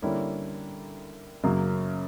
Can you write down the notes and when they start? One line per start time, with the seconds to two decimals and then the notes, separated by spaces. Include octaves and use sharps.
0.02 D3 G3 A#3 C#4 E4
1.43 F#2 C#3 F#3 A#3